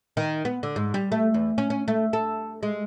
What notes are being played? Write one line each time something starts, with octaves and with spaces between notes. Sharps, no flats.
D#3
B3
D3
G#2
G3
A3
E2
C#4
C#4
A3
A4
G#3